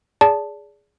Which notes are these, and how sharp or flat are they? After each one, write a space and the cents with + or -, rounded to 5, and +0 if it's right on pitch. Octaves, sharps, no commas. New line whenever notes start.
G#4 +0 D5 -25 A5 +0